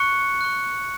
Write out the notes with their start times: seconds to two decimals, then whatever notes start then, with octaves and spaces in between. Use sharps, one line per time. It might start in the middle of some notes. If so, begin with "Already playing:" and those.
Already playing: C#6 F#6 C#7
0.41 C#6 F#6